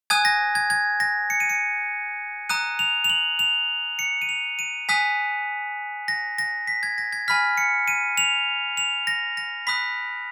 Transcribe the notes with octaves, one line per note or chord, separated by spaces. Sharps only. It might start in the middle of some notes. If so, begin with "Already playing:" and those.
G#5 D#6 F#6 G#6
A#6
G#6
G#6
A#6
C#7
D#7
C#7
A#5 D#6 F#6 D#7
F7
F7
F#7
F7
C#7
D#7
F7
D#7
G#5 D#6 F#6 B6
A#6
A#6
B6
G#6
A#6
G#6
G#5 B5 F6 B6
C#7
D#7
F7
F7
A#6
A#6
B5 D#6 F#6 B6